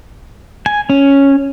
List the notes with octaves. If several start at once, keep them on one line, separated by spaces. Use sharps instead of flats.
G#5
C#4